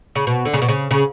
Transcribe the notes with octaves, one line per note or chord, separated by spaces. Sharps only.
C#3
B2
D3
C#3
B2
C#3
C#3